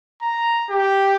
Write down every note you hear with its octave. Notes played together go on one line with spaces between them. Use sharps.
A#5
G4